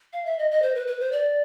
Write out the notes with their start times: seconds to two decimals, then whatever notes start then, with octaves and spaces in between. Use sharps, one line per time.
0.13 F5
0.25 E5
0.39 D#5
0.51 D#5
0.62 C5
0.75 B4
0.87 B4
1.00 C5
1.12 D5